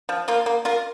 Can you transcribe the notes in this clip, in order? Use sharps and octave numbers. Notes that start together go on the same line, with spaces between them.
F3
A#3 F4
A#3
F4 A#4